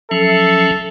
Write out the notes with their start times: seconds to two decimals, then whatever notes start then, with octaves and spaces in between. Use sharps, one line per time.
0.11 F3 F#3 C#4 A4 E5